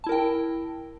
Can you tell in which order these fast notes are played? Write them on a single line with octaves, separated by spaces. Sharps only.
A5 E4 A#4 G5